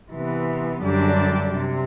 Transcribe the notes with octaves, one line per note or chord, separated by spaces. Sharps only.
C3 E3 B3
F#2 D3 G3 D4 G4
C3